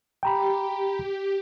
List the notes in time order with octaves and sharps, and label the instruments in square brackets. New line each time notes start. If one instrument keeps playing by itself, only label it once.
[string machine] G4 [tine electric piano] G5 A#5 B5